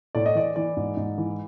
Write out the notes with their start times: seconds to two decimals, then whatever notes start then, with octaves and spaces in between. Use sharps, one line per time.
0.15 A2 D5
0.26 D#5
0.35 E3 D5
0.56 E3 D5
0.77 G#2
0.97 G#2
1.18 E3